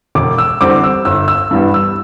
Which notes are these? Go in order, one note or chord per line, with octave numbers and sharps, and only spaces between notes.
E1 D6
E6
E2 D3 G3 C4 D6
E6
G1 E6
E6
G2 E3 G3 B3
E6